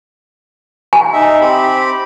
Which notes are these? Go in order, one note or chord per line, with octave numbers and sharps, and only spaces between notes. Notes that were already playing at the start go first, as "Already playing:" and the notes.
G#5
D#4 E5
C4 G4 B5